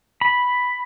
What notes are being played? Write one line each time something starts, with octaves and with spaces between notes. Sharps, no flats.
B5